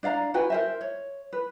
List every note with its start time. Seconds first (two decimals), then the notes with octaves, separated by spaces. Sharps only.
0.03 D4 D5 F5 A#5
0.34 F#4 B4 G5 G#5
0.50 A#4 C5 E5
0.81 C#5
1.33 B4